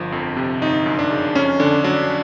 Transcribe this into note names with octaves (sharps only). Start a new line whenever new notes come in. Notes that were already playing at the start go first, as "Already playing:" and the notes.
Already playing: G1 F3
F2
C3
G1 D#4
F#2
D4
C#3
F2 C#4
D3 D4
F#3 D4